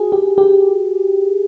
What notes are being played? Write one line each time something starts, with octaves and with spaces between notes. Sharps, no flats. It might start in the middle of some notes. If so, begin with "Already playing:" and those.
Already playing: F#4 G#4
G4
G4